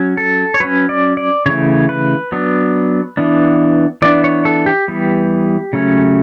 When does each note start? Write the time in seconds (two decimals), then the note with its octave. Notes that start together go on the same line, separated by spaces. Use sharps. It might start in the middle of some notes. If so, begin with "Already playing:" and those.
Already playing: F#3 C#4
0.17 A4
0.54 C#5
0.60 F#3 C#4 B4
0.89 D5
1.17 D5
1.46 C#3 E3 A3 C#5
1.89 B4
2.32 F#3 B3 D4
3.17 E3 B3 D4
4.02 E3 B3 D4 D5
4.24 C#5
4.45 A4
4.66 G4
4.88 E3 G3 B3
5.73 C#3 F#3 A3 C#4